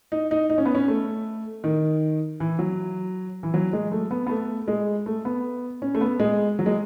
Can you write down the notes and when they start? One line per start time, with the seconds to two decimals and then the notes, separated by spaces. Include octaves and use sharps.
0.12 D#4
0.31 D#4
0.50 D#4
0.58 C#4
0.66 B3
0.75 C#4
0.88 A3
1.64 D#3
2.40 E3
2.59 F#3
3.43 E3
3.54 F#3
3.73 G#3
3.92 A3
4.11 B3
4.27 B3
4.29 A3
4.68 G#3
5.06 A3
5.25 B3
5.82 C#4
5.95 A3
6.01 B3
6.20 G#3
6.59 F#3
6.66 G#3